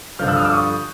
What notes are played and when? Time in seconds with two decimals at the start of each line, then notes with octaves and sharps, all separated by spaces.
0.19 G2 D3 F3 F6 G6
0.28 E6 F#6
0.36 D#6 F6
0.44 D6 E6
0.53 C#6 D#6